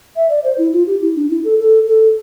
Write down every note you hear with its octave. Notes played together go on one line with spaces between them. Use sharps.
E5
D5
C5
E4
F4
G4
E4
D4
E4
A4
A4
A4